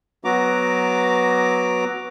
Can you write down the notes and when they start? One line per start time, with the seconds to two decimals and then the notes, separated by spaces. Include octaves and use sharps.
0.25 F#3 B3 F#4 A#5 D6